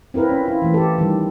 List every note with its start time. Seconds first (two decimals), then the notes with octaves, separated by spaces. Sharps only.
0.14 C4 E4 A#4 B4
0.29 C#4
0.45 E4 F4
0.62 E3 A3
0.74 G4 A4
0.98 D#3 G3